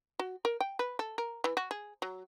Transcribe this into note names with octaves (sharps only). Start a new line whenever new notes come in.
F#4
A#4
G5
B4
A4
A#4
E3
F#4
G#4
F#3